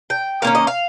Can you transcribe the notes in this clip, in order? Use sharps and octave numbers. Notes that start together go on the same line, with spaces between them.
G5
D#3 A#3 C#4 F5
D#5
F5